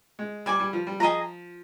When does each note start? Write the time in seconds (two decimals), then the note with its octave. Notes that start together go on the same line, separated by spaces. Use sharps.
0.19 G#3
0.46 G3 D5 G#5 D6
0.59 G3
0.73 F3
0.87 G3
1.00 F3 G#4 D#5 A#5